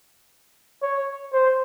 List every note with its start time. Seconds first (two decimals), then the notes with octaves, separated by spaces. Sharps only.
0.83 C#5
1.33 C5